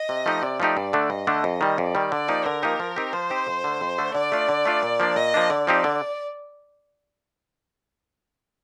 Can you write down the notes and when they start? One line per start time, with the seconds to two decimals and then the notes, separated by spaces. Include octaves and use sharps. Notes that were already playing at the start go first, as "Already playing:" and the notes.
Already playing: D#5
0.09 C3
0.26 F3 A3 D#4 G4
0.42 C3 D5
0.60 F3 A3 D#4 G4
0.77 G2
0.93 D3 A3 D4
1.10 G2 D#5
1.27 D3 A3 D4
1.44 F2
1.61 D#3 G3
1.78 F2 D5
1.95 D#3 G3
2.11 D3 D5
2.28 F3 A#3 D#4 G4
2.45 D3 A#4
2.63 F3 A#3 D#4 G4
2.80 F3
2.96 C4 D#4 G4
3.13 F3 C5
3.30 C4 D#4 G4
3.47 F2
3.64 D3 A3
3.81 F2
3.98 D3 A3
4.15 D3 D5
4.32 A3 D4 F4
4.49 D3
4.65 A3 D4 F4
4.83 A#2
5.00 F3 A#3 D4
5.16 A#2 D#5
5.34 F3 A#3 D4
5.50 D3 D5
5.67 F3 C4 D#4 G4
5.84 D3